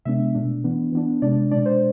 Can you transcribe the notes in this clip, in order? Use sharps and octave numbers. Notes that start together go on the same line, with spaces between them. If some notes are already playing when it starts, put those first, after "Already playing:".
C3 G#3 B3 D4 E5
B2 A3 D4
E3 B3 D4
E3 B3 D4
C3 G#3 D4 D5
B2 G#3 D4 D5
C5